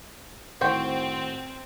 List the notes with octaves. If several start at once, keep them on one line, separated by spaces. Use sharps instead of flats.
A2 D#3 C4 F#4 C5 G5